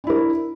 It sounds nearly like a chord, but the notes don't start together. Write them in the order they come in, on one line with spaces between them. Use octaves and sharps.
D4 E4 A#4